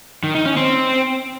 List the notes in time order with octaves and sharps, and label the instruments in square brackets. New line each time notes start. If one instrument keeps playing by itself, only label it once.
[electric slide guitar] D#3
D#4
C#4
C4